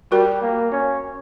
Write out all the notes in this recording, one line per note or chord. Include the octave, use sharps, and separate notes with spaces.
G3 F#4 A#4
A#3
C#4